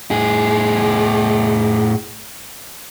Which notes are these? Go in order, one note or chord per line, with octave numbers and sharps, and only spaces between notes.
A2 G#4